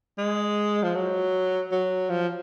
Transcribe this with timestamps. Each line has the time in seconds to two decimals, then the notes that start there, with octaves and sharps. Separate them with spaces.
0.18 G#3
0.83 F3
0.95 F#3
1.72 F#3
2.10 F3